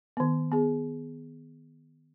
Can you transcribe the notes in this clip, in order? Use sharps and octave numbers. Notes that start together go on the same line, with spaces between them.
D#3 B3
B3 G#4